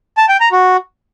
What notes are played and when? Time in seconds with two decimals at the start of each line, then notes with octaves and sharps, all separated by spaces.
0.17 A5
0.29 G5
0.40 A#5
0.52 F#4